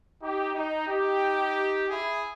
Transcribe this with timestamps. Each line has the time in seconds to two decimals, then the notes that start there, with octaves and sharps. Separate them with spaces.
0.21 D#4 G4
0.55 D#4
0.88 D#4 G4
1.88 E4 G#4